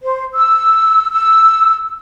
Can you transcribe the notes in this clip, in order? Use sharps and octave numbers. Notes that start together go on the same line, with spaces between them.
C5
E6
E6